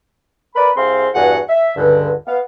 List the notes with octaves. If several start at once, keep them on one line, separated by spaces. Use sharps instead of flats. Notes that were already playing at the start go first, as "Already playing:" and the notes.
A#4 B4 D5 B5
C2 C4 G#4 F5 C6
E2 G2 F#4 G#4 F#5
E5
C#2 G2 D3
B3 F5